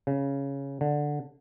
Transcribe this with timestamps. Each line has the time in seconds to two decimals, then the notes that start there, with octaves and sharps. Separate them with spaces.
0.07 C#3
0.81 D3